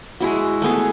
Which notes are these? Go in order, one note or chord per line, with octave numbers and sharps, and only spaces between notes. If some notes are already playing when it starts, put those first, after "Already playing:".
G#3 E4 F#4
A3 B3 G#4